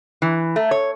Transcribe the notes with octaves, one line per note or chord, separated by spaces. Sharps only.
E3
A3
C#5